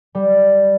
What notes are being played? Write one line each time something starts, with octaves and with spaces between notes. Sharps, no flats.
G3